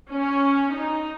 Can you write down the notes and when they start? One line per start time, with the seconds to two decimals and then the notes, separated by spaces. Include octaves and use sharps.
0.10 C#4
0.75 D#4